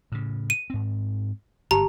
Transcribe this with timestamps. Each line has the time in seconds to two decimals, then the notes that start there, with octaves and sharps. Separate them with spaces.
0.12 A2 C#3
0.50 D#7
0.70 G#2 C4
1.71 G1 G#2 G4 A5 A#5